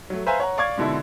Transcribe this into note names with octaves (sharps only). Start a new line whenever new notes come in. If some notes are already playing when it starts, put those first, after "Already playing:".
F#3 A3
B4 C5 E5 F5 G#5 A#5
C#5 F#5 A#5
D5 F5 C#6 D6 G#6
G#2 B2 D3 E4